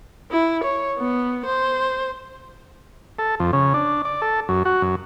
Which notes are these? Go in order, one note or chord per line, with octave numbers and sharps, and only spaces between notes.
E4
C#5
B3
C5
A4
F2
C#3
D4
D5
A4
F#2
F#4
F#2